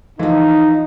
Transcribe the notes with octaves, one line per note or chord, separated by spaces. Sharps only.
E3 F3 D#4